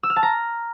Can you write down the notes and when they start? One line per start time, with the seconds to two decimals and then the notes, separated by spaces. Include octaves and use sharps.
0.03 E6
0.10 F6
0.16 A5
0.23 A#5